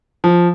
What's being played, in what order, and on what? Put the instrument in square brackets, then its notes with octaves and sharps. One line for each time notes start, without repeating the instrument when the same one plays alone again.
[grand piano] F3